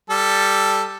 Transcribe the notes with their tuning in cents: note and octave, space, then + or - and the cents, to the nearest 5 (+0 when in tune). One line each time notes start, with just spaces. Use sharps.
G3 +0 A4 +0